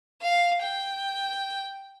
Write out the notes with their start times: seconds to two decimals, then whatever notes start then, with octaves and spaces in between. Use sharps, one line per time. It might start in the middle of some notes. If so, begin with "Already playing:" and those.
0.22 F5
0.62 G5